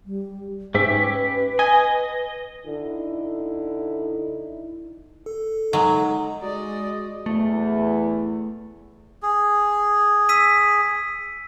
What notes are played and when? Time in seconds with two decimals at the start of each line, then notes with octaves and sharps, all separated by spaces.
0.05 G3
0.74 G#2 C#4 G4 B4 E5
1.59 D#5 G#5
2.67 D3 D#4 E4
5.26 A4
5.73 F#3 G#3 D#4
6.42 G#3 F#4 D5 D#5
7.26 E2 A3
9.23 G#4
10.29 E6 B6 D#7